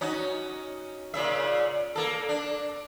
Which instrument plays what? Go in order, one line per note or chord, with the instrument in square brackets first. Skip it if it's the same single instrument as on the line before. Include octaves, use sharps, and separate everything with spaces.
[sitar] C#4 D#4 F#4
A#2 C#3 E5
A#3 A4
D4